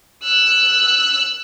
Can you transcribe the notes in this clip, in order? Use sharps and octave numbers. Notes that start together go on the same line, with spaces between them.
E6 F#6